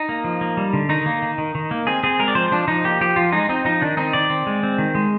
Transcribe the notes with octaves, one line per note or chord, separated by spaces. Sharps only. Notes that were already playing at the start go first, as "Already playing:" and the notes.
Already playing: D#4
A#3
F3
A#3
G3
D3
D#3 D#4
A#3
D#3
D#3
D#3
A#3
C4 G#4
C4 G#4
G#3 A#4
D5
F3 C5
F3 D4
F3 D#4
A#3 G4
F3 G4
F3 F4
G#3 D#4
C4 D#4
F3 D#4
D#3 D4
C4 D#4
D#3 D5
C4
G#3
C4
D#3
G#3